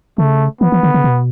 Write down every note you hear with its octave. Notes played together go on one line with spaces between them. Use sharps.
C#3 A3
E3 B3
E3
D3
C#3
B2